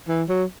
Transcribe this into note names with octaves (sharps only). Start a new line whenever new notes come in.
E3
F#3